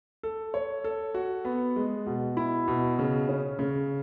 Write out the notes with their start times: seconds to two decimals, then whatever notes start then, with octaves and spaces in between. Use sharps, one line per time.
0.23 A4
0.54 C#5
0.84 A4
1.14 F#4
1.45 B3
1.76 G#3
2.06 B2
2.37 E4
2.68 B2
2.99 C#3
3.29 C#4
3.59 C#3